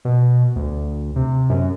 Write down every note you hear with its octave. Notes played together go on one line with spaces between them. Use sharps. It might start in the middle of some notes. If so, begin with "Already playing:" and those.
B2
D2
C3
F#2